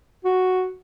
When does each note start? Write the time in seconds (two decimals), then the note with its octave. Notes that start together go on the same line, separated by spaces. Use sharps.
0.24 F#4